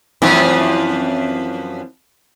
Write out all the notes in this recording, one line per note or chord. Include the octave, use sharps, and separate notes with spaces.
F#2 E3 F3 C4 E4